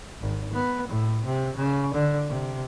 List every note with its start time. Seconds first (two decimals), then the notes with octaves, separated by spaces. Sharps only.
0.20 G#1
0.53 B3
0.88 A2
1.25 C3
1.56 C#3
1.94 D3
2.28 C3